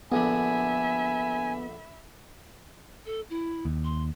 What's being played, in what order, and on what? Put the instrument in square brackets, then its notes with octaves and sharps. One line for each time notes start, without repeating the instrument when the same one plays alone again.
[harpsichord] A#1 D3 D4 [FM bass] B3 [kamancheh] E5 B5 [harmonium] G#5
[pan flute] A4
E4
[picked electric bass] D#2
[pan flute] C6